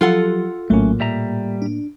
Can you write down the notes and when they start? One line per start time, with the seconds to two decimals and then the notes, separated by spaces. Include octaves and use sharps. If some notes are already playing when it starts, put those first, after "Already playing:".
0.01 F3 F#3 F4 G4 A4 F#5
0.70 A#1 A2 F#3 A3 A#3 C#4
1.00 A#2 G3 E5 A#5
1.62 D4